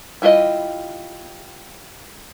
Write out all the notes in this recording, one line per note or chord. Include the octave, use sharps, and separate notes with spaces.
G3 E4 F4 A#4 D#5